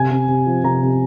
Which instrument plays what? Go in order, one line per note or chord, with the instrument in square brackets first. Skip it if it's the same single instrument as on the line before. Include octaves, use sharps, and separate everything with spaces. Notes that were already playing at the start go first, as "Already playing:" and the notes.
Already playing: [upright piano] C3 G#5
C3
C3
F3
C3 A#5
C3